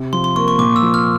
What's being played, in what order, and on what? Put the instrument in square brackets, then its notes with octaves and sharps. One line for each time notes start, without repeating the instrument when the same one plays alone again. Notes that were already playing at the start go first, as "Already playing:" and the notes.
Already playing: [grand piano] C3
[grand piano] F3 [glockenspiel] C6
[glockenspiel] C6
[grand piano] A#3 [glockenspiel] C#6
[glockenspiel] C#6
[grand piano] A#2 [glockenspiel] D6
[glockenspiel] E6
[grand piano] F3
[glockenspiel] F6